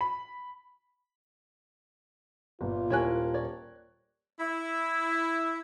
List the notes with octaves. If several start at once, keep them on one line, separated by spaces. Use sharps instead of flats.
B5
G1 A#2 F4
D#1 E4 A#4 C#5 G#5 F#6
C#5 D5
E4